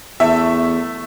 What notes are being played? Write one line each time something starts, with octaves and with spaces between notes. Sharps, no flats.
E2 A3 E5